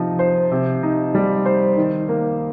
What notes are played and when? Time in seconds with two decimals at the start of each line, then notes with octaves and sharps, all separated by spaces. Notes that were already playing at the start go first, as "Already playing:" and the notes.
Already playing: C3 F3 D#4
0.19 C5
0.51 C3
0.83 D#4
1.15 G3
1.45 C5
1.77 D#3
2.09 A#3